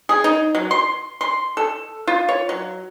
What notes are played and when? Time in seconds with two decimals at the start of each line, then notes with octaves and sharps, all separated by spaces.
0.09 G#4
0.24 D#4
0.55 F#3
0.71 C6
1.21 C6
1.57 A4
2.07 F4
2.29 C#5
2.49 F#3